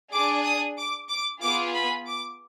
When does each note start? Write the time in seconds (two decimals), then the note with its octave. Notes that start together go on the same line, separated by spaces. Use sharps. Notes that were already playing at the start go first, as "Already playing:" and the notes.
0.12 D4 G#4 D6
0.45 D#6
0.78 D6
1.09 D6
1.42 B3 F4 G#4 D6
1.74 B5
2.07 D6